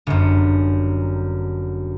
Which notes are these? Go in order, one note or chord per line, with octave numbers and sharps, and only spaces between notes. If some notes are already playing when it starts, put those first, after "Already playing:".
G1 F#2